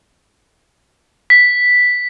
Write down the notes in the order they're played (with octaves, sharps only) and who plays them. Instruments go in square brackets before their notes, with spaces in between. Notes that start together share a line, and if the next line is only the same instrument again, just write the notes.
[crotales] B6